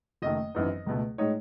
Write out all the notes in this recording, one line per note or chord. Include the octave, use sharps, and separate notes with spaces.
F#1 F#2 D#3 A3 D#5
G#1 F#2 E3 B3 D#4
C#2 B2 A3
A2 G#3 D#4 C#5